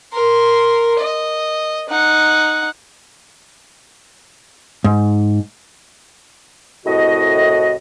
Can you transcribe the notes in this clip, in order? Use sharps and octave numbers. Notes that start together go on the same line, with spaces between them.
A#4 C6
D#5
D#4 F#5
G#2
C2 A2 F#4 D#5